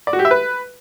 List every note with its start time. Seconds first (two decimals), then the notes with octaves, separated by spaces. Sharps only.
0.07 D5
0.13 F#4
0.19 G4
0.25 E5
0.31 B4